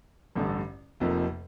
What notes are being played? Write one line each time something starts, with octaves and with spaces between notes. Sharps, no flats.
A1 G2 D3 A3
F1 F2 C3 F3 A#3